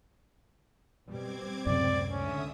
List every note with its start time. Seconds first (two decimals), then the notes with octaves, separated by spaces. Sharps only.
1.08 B2 G3 C4 D6 G#6
1.67 C#2 F#2 A2 C3 D5
2.11 D3 C#4 E5 D#6